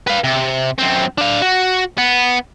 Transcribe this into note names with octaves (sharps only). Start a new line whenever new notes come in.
B4 F5
C3
F#2 C4
D4 F5
F#4
B3